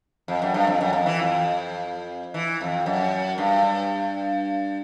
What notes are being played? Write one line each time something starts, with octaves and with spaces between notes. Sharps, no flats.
F2
F#2
G2
F2
F#2
F2
E3
F2
E3
F2
F#2
G2